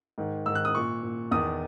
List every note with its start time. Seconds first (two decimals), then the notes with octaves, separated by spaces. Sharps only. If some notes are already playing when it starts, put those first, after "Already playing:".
0.18 G#2 D#3
0.46 G#2 E6
0.49 D#3
0.55 F#6
0.65 D#6
0.75 A#2 C#6
1.03 A#2
1.31 E2 D#3 D#6